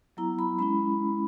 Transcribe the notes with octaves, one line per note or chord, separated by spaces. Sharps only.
F#3 B3 E4 A#5
B5
G#3 C#4 E4 B5